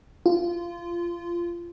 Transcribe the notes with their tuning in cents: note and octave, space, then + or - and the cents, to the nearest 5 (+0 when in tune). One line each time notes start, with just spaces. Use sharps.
F4 -20